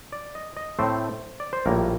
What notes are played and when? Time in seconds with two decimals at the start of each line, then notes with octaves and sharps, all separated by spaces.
0.12 D5
0.35 D#5
0.57 D#5
0.79 A2 A3 C4 C5
1.40 D5
1.53 C5
1.66 A#1 A2 G3 A#3 A#4